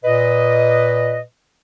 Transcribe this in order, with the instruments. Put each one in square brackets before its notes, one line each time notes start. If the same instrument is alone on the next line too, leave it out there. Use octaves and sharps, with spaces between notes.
[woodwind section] A#2 B4 D#5